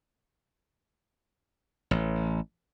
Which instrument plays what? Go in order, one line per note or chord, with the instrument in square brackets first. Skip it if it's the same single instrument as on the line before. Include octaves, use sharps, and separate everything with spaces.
[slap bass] A1